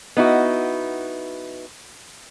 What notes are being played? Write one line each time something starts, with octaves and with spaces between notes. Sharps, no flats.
B3 D#4 E4 F#4